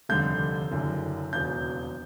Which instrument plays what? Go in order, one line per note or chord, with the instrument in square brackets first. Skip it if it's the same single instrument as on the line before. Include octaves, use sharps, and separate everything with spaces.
[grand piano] F1 D#2 D3 G3 G6
F#1 F#2 D3
E1 D#2 C#3 F#3 G6